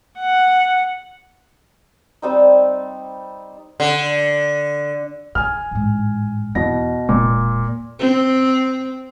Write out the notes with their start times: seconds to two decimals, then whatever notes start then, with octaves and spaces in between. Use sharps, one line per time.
0.19 F#5
2.22 G3 C4 D#4
3.80 D3
5.35 C#3 G#5 F6
5.71 A1 G#2
6.55 E2 B2 A#6
7.09 E1 A#2
7.99 C4